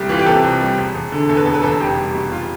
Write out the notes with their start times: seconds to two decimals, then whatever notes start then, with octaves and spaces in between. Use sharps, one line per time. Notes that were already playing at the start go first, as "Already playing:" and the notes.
Already playing: C2 G3
0.09 E3 F4
0.19 G4
0.26 C3 A4
0.43 C2
0.61 G3
0.78 E1
0.95 E1
1.12 D3
1.29 E2 A4
1.37 B4
1.46 E1 A4
1.54 B4
1.62 E1 A4
1.80 F1 G4
1.98 G3
2.15 B2
2.32 F4